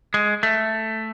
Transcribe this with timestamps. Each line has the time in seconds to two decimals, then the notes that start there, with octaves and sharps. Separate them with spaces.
0.14 G#3
0.43 A3